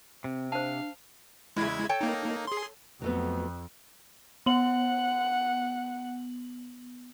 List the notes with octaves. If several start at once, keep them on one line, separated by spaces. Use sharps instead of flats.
C3 C4
D4 C5 F5 A5
E2 C#3 G#3 E4 G#6
A4 C#5 G5
A#3 D#4
G#4 C6
F2 F#3 A3 B3
B3 F#5 F#7